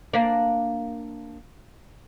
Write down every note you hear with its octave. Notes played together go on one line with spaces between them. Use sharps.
A#3 D4